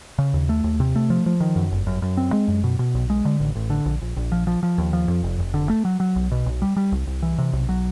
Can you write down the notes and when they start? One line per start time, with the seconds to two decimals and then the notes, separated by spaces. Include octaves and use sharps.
0.18 C#3
0.34 D#2
0.49 A3
0.64 D#2
0.80 C3
0.96 A3
1.10 F3
1.26 F3
1.40 D#3
1.56 F#2
1.71 G1
1.87 F#2
2.02 F#2
2.17 C4
2.33 G#3
2.48 F#2
2.64 B2
2.79 B2
2.95 B1
3.10 G#3
3.25 D3
3.40 A1
3.55 A1
3.70 D3
3.86 A#1
4.02 A#1
4.17 A#1
4.32 F3
4.47 F3
4.63 F3
4.78 D#2
4.93 F3
5.08 F2
5.23 F1
5.39 F1
5.54 D3
5.69 A3
5.85 F#3
6.00 F#3
6.16 B1
6.31 B2
6.46 B1
6.62 G3
6.77 G3
6.92 C2
7.07 C2
7.22 E3
7.38 C3
7.53 B1
7.69 F#3